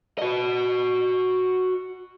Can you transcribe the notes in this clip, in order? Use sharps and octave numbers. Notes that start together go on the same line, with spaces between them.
F#4 D#5